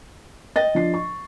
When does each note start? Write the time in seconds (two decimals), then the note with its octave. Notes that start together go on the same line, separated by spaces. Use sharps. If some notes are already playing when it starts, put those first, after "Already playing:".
0.56 D#5 G5 A6
0.75 F3 D4 C7
0.94 C#6